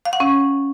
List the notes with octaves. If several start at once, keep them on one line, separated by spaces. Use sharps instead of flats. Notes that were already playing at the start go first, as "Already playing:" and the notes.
F5
F#5
C#4